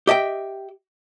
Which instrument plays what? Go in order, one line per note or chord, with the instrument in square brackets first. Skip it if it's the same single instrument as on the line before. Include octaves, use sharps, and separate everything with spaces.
[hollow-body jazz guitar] G4 D#5 E5 G5